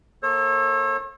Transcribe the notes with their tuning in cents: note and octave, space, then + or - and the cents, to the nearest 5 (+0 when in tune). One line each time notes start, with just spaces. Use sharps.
A#3 +0 A4 +0 C#5 -40